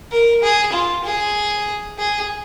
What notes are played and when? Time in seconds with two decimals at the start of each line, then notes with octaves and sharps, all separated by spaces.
0.12 A#4
0.43 G#4
0.73 F4
1.04 G#4
1.98 G#4